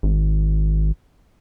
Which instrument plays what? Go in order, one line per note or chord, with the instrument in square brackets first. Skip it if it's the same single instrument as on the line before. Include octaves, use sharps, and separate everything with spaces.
[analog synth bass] G#1